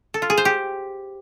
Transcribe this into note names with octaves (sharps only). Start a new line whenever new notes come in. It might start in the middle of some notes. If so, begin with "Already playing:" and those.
A4
F4
G#4
C5
G4